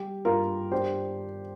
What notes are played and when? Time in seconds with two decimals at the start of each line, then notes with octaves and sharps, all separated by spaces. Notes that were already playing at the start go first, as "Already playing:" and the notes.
Already playing: G3 G4
0.25 G2 F4 A#4
0.72 D4 G4 C5